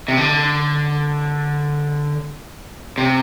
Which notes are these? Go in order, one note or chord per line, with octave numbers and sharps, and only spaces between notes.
C3
D3
C3